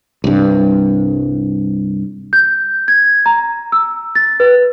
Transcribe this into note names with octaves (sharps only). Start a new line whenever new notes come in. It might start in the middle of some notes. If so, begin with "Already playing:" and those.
C2 G2
G6
G#6
A#5
E6
A6
B4